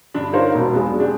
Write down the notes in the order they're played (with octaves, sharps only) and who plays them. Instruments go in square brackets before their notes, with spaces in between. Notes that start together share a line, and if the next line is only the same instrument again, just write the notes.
[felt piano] G2 D3 D4
D#4 F4 A#4 C5 C#5 F5
E1 B2
G#3 B3 D4
F#3
G#3 D4 G4